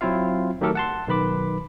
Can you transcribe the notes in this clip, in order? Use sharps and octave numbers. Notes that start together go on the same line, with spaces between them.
F#3 C4 E4 F4 F5
D#3 F#3 A3 G4 A4 A#4
F#5 A5 C6
B1 D#3 B4 B5 D6